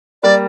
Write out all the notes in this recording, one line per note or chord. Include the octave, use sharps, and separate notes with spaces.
G3 A#3 D5